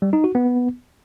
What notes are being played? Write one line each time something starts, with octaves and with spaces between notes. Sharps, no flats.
G3
D#4
F#4
B3